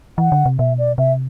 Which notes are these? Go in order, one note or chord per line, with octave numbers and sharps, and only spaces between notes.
E3 F#5
D3
C3
B2 E5
D5
C3 E5